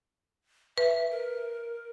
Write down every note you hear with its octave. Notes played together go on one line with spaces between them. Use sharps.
B4 E5
A#4